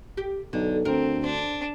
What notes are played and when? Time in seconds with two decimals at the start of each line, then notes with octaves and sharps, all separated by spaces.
0.17 G4
0.53 B1 D3
0.85 D2 C4 A#4
1.24 D4 C5